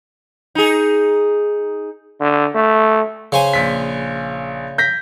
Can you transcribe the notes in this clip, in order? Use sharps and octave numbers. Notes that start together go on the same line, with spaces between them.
D#4 G#4
D3
A3
C#3 C5 G#5
A#1 B6
G6 A#6 B6